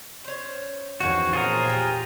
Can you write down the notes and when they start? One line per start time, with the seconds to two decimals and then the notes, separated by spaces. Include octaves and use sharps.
0.24 C#4 C5
1.00 E2 D#3 F3 C4 C#4 F#4
1.33 A#2 F4 G#4 A#4
1.67 G4 G5